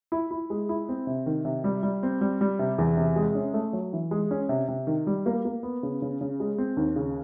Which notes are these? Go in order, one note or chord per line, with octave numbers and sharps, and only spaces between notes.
E4
E4
G#3
E4
C4
C3
D#3
C3
G3
G3
C4
G3
G3
C3
E2
C3
G#3
C#4
A3
F#3
E3
G#3
C#4
C3
C3
D#3
G3
A#3
A#3
B3
C#3
C#3
C#3
G#3
C4
D#2
C#3